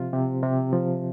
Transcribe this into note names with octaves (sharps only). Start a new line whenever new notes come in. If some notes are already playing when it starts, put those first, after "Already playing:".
Already playing: C3 F3 F4
C3
C3
F3